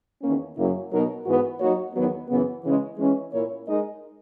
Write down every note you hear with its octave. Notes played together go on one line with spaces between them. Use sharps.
E2 D#3 A#3 C#4
F#2 C#3 F#3 A#3 E4
B2 F#3 B3 D#4 A#4
G#2 E3 B3 F#4 B4
F#3 A#3 D#4 F#4 C#5
E2 D#3 F#3 B3
F#2 C#3 E3 B3
C#3 E3 G#3 C#4
E3 G#3 C#4
A#2 A#3 E4 A#4 C#5
G#3 D#4 A#4 D#5